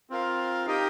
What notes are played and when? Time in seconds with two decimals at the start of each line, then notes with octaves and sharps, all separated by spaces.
0.10 C4 F4 A#4 F5
0.66 D#4 G4 A#4 D#5 G5